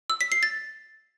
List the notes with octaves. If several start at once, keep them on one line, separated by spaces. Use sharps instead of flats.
E6
B6
C7
A6